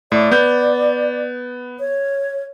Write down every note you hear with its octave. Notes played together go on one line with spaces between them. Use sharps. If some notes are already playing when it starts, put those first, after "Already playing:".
A2 D5
B3 G6
C#5